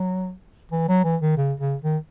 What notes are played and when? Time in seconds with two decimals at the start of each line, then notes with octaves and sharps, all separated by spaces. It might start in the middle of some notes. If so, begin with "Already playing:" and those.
Already playing: F#3
0.72 E3
0.88 F#3
1.04 E3
1.21 D#3
1.37 C#3
1.60 C#3
1.82 D#3